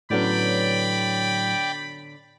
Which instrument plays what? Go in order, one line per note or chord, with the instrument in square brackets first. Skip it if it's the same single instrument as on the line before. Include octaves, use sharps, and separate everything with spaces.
[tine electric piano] A2 F#3 [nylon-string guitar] D3 B3 C#4 [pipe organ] D5 G5 [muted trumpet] B5